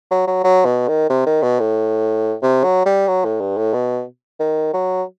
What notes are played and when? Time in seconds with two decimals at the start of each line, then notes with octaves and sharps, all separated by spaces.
0.11 F#3
0.27 F#3
0.44 F#3
0.65 B2
0.88 D#3
1.10 C3
1.26 D#3
1.43 B2
1.60 A2
2.42 C3
2.64 F#3
2.85 G3
3.08 F#3
3.25 A2
3.40 G2
3.57 A2
3.74 B2
4.40 D#3
4.73 F#3